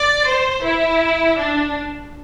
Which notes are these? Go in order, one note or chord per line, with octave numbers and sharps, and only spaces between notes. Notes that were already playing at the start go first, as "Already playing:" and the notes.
Already playing: D5
C5
E4
D4